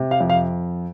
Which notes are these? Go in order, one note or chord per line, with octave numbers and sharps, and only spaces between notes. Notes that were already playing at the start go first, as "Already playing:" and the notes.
Already playing: C3
F5
F2
F5